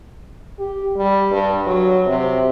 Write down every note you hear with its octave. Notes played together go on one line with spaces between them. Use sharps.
G4
G3
G2
F#3
C3